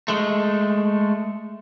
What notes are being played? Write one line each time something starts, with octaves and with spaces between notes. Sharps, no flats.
G#3 A3